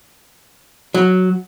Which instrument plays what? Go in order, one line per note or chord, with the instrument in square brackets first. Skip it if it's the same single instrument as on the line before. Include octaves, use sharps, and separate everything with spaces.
[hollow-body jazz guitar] F#3